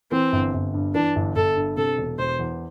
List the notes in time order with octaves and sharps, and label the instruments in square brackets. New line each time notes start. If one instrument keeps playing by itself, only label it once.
[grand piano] E3 [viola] C4
[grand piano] G1
G1
G2
[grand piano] E3 [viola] D4
[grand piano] G1
[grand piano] G1 [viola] A4
[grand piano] G2
[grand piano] C3 [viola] A4
[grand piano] E1
[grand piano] E1 [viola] C5
[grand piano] E2